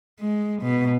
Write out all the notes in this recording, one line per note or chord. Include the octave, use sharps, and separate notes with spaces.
G#3
B2